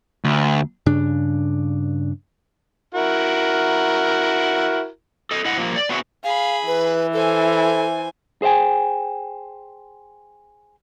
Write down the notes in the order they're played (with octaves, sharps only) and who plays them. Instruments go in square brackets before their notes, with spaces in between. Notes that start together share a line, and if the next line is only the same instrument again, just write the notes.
[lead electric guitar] D2
[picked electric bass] G2 C#3 D4
[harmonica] E4 F#4 A#4
[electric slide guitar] A4 D#5
E4 D#5 F#5
F3 G3 A#3 F4
D5
B3 C4 F#4 G#4 C#5 E5
[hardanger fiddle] G#4 B5 [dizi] F5
[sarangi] E3 [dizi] B4
[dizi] A4 [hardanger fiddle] C5 G#5
[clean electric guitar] G#4 C5 D#5 G5 G#5